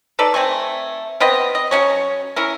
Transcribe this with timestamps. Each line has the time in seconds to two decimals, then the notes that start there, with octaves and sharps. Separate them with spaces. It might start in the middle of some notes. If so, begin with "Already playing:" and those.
0.19 D#4 A4 B4 D5
0.34 A3 C4 G#5 C#6
1.20 B3 C4 B4 D#5
1.55 D#5
1.71 F#3 C4 C#4 C#5
2.36 C#4 E4 A#4